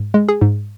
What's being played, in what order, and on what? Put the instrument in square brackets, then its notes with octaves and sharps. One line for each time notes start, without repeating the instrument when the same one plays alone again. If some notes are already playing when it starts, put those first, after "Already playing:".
Already playing: [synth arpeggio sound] G#2
G#3
G#4
G#2